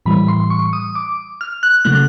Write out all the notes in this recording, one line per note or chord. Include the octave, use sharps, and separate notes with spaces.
A2 E3 G3 B5
C6
C#6
D#6
D6
F6
F#6
C#3 F#3 A3 F#6